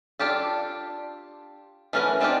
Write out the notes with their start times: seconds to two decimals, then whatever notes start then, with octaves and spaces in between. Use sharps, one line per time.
0.19 D4 F4 G4 A4
1.93 E3 A3 C#4 A#4 B4
2.20 C4 D4 D#4 F4 G4